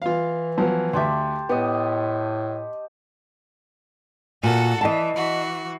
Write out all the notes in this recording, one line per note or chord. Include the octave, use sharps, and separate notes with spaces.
E3 F4 F5
F3 F#3 B3
D2 G4 E5 A5 C6
A2 B3 G4 D#5
A#2 F#4 A4 F#5
E3 D#5 F#5 A5
E3 F#4